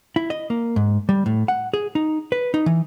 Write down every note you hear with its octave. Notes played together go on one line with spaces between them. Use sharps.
E4
D#5
A#3
G#2
G3
A2
F#5
G#4
D#4
B4
D#4
E3